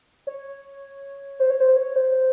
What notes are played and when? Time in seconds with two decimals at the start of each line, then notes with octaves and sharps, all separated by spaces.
0.27 C#5
1.40 C5
1.50 C#5
1.60 C5
1.76 C#5
1.96 C5